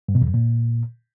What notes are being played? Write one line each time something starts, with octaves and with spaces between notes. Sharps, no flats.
G2
B2
E2
F#2
A#2